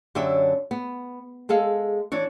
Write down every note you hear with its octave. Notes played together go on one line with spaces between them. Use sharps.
F#2 D3 D4 G4 C#5 E5
B3
G#3 G#4 A4 F5
E3 D4 C#5